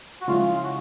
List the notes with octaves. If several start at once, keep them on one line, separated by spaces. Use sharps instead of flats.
F#4
C#3 F3 G#3 C#4 E4 F4
F#4